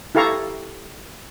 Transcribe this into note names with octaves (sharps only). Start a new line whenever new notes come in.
E4 G4 A4 F5 A#5 C#6